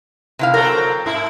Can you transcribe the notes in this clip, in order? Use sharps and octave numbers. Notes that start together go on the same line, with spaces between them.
C3 E4 F5
F#3 C4 A4 A#4
G#2 E4